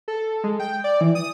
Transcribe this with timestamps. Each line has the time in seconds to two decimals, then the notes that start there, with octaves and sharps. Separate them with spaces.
0.08 A4
0.44 G#3
0.60 G5
0.84 D5
1.01 E3
1.15 D#6